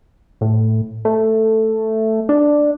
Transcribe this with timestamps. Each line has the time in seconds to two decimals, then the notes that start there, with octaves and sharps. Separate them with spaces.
0.41 A2
1.05 A3
2.29 D4